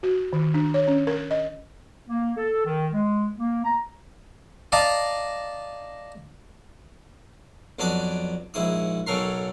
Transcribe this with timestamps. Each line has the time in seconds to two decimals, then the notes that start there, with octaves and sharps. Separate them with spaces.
0.03 F#4
0.33 D#3
0.54 D4
0.74 C#5
0.87 C#4
1.07 A#4
1.31 D#5
2.09 A#3
2.37 A4
2.66 D#3
2.92 G#3
3.37 A#3
3.65 A#5
4.72 D5 D#5 F5 A5 A#5
7.79 F2 F#3 B3 D4 D#5 D6
8.54 A#1 G#2 E4 D#6
9.06 B1 C#3 F#3 A4 A#4 C6